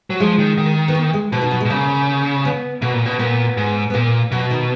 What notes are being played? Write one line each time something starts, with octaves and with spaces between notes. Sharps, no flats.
F#3
F3 G#3
D#3
D#3
B3
A#3
G#3
B2 F3
D#3
F#3
G#3
B2
C#3 A#3
B3
B2 A#3
A#2
B2
A#2 B3
G#2
B3
A#2 A#3
B2 F#3
D#3